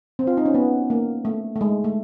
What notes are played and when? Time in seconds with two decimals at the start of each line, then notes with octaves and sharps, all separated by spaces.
0.19 C4
0.27 F4
0.37 D#4
0.45 C#4
0.54 B3
0.90 A#3
1.25 A3
1.55 A3
1.61 G#3
1.84 A3